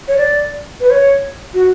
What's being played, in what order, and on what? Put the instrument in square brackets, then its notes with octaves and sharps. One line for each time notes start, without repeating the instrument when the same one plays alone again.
[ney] C#5
D5
B4
C#5
F#4